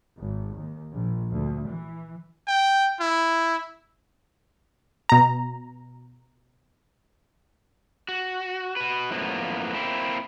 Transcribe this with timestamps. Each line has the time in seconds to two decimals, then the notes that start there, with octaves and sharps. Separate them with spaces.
0.19 G#1
0.57 D#2
0.94 A#1
1.31 D2
1.69 E3
2.48 G5
3.00 E4
5.09 B2 A#5
8.09 F#4
8.76 F#4 B4
9.11 F#2 A2 F3 A#3 B3
9.74 A#3 C4 E4